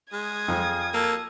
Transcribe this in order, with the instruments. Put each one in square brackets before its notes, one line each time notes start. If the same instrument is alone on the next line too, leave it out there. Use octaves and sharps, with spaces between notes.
[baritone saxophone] G#3 [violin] D#6 G#6
[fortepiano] F2 [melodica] G#4 F5
[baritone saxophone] A#3 [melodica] A4